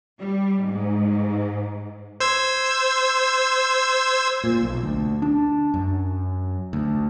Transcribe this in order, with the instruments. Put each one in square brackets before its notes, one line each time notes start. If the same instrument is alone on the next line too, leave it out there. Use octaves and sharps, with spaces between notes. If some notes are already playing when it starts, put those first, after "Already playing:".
[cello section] G3
G#2
[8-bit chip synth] C5 E6 G#6
[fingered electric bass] A#2
B1
D2
D4
F#2
D2